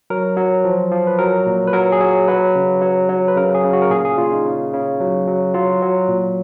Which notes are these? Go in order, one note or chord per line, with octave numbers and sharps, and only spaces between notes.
F#3 A#4
F#3
F3
F3
B4
F#3 A#4
A#2
B4
F#3 A#4
G#4
F#3
F#3 B4
C#3
F#3
F#3
B4
C#3 A#4
G#4
C#3
F#4
A#4
A#2 G#4
G#4
A#2 F4
D#4
C#3
C#3
F#3
F#3
F#3 F4
F#3
A#2